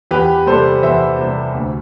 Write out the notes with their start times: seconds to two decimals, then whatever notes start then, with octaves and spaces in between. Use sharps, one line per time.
0.11 E2 G4 B4
0.46 C3 G3 A4 C5
0.83 E2 C5 E5
1.19 C3 G3
1.55 D2